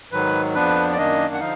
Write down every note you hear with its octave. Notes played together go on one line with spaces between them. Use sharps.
G#2 D#3 F#3 B4
F2 F3 B3 D4 B4
D5
F#2 D#3 A#3 D4 D#5
F#5
D3 F3 D#4 F5